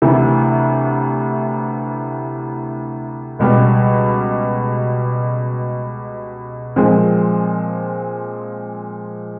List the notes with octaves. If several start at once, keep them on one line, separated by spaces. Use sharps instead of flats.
D2 C3 E3
C#2 B2 G3
A#2 F3 G#3 C4